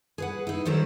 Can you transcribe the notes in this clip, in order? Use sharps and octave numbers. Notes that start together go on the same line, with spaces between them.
G#4 B4 F#5
D#4 E4
D#3 F#3 G3 A3 C5